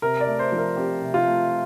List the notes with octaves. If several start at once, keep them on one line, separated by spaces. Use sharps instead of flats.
C3 A#4
D5
A3
C5
F3
A#4
C4 G4
C3
F4
A3